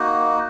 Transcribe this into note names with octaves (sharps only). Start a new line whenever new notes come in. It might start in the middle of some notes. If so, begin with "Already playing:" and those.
Already playing: A#3 D#4 F#4